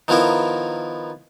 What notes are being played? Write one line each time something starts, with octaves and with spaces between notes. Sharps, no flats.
D#3 F3 B3 E4 A#4